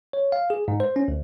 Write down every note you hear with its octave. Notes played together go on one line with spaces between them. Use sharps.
C#5
F5
G#4
G#2
C5
C#4
D2